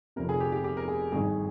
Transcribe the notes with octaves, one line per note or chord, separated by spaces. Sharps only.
F1 F2 C3 A#4
G#4
G4
G4
G4
A#4
G#4
G#1 G2 D#3 G#4